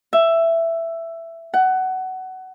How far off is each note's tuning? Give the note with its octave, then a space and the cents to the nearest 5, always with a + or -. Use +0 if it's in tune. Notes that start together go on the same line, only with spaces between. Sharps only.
E5 +10
F#5 +20